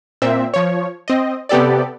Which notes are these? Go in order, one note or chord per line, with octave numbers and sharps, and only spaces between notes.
A#2 C4 E5
F3 C#5
C4 D#5
C3 B3 G4 A4 D5